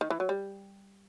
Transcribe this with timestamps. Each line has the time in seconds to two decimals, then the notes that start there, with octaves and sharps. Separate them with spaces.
0.01 D#3
0.10 E3
0.20 F#3
0.29 G3